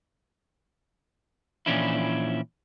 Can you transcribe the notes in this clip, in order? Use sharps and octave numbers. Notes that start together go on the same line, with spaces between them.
A#2 E3 F3 C#4 D4 E4